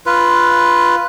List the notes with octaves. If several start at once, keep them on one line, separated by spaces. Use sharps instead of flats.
F4 B4